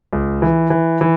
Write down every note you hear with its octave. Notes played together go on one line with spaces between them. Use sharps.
C#2
E3
E3
E3